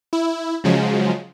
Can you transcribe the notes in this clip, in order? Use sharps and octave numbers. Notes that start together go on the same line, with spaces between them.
E4
C#3 F3 F#3 G#3